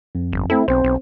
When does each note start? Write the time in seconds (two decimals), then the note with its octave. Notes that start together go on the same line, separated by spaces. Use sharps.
0.15 F2
0.33 G1
0.50 A3 C4 E4 A4
0.68 B1 C4 C5
0.84 B1